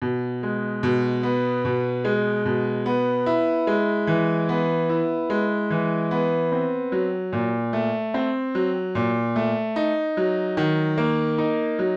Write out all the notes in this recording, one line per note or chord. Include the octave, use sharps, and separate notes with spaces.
B2
G#3
B2
B3
B2
G#3
B2
B3
E4
G#3
E3
B3
E4
G#3
E3
B3
C4
F#3
A#2
A3
C4
F#3
A#2
A3
D#4
F#3
D#3
A#3
D#4
F#3